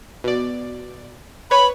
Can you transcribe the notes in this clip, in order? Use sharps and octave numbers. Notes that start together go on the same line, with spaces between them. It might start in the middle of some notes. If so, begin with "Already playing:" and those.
B2 D5
B4 C#5 B5